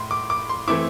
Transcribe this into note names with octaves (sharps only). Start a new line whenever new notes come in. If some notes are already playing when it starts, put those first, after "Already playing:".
Already playing: A2 C6
D6
D6
C6
E3 A3 C4 E4 D6